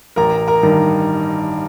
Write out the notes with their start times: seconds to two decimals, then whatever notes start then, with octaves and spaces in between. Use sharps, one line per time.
0.16 A1 A#4 A#5
0.48 A#4 A#5
0.63 G2 D#3